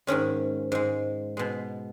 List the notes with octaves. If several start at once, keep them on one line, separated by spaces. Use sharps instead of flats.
G#2 D#3 G#3 C#4
G#2 G#3
B2 G#3